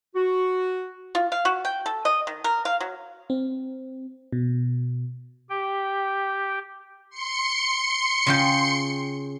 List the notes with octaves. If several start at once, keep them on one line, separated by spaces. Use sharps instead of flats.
F#4
F4
F5
F#4
G5
A4
D#5
D#3
A#4
F5
F#3
C4
B2
G4 G5
C6 C#7
C#3 F4 G5